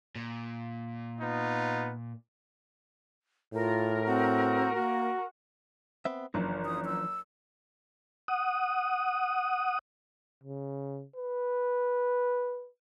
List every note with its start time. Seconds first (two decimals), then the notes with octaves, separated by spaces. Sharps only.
0.16 A#2
1.21 B3 D#4 F4
3.54 A2 F4 A#4
4.06 C4 F#4
4.75 A#3 F#4
6.05 B3 C4 E5
6.34 F#1 E3 F3 D4
6.65 D#6
6.85 E6
8.28 F#5 D#6
10.43 C#3
11.16 B4